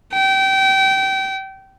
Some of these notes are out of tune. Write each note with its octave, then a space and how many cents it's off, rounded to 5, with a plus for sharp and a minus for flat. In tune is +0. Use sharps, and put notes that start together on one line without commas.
G5 -25